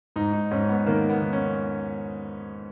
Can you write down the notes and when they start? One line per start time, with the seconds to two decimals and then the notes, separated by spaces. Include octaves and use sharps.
0.16 G#2 D#4
0.33 D#4
0.51 G#2 C#4
0.69 B3
0.86 D#3 A#3
1.10 B3
1.22 D#3
1.33 C#4